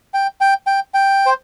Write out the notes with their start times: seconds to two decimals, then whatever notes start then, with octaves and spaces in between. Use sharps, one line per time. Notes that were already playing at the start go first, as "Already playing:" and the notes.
0.14 G5
0.41 G5
0.67 G5
0.94 G5
1.26 C5